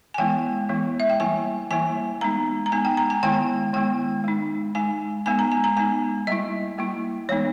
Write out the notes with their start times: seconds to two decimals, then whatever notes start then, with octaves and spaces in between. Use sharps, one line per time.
0.14 G#5
0.18 E3 G#3 B3 E4 G5
0.69 E3 G#3 B3 E4
1.00 E5
1.10 G5
1.20 E3 G3 A#3 E4 G#5
1.71 E3 G3 A#3 E4 G#5
2.21 G#3 B3 D#4 A#5
2.66 A#5
2.72 G#3 B3 D#4 G#5
2.85 G5
2.97 A#5
3.10 G#5
3.23 D#3 G#3 B3 E4 G5
3.73 D#3 G#3 B3 E4 G5
4.24 G#3 D#4
4.75 G#3 D#4 G#5
5.26 G#3 B3 D#4 G#5
5.39 A#5
5.52 G#5
5.64 A#5
5.77 G#3 B3 D#4 G#5
6.27 G3 A#3 E4 D#5
6.78 G3 A#3 E4
7.29 E3 G#3 B3 D#4 C#5